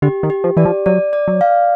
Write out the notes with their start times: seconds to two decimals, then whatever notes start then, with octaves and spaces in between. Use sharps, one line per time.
0.02 D3 G4
0.23 D#3
0.30 G4
0.44 F3
0.57 E3 D5
0.65 F3
0.86 F#3 D5
1.13 D5
1.28 F#3
1.41 F5